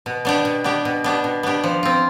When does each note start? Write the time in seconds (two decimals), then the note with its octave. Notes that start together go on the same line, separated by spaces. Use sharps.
0.06 B2
0.25 B3 D4 G4
0.45 B2
0.64 B3 D4 G4
0.85 B2
1.04 B3 D4 G4
1.24 B2
1.43 B3 D4 G4
1.64 F3
1.83 C4 F4